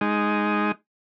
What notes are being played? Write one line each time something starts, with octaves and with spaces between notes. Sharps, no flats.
G#3 D#4